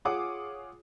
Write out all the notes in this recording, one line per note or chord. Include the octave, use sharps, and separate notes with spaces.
F4 G#4 C#5 F#5 D6 D#6